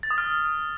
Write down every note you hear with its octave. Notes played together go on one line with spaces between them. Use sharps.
A6
D#6
F6